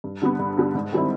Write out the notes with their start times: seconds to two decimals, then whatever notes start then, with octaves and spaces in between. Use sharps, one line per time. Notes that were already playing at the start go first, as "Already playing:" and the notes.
0.04 G2
0.22 D3 G3 B3
0.39 G2
0.57 D3 G3 B3
0.75 G#2
0.92 D#3 G3 C4 E4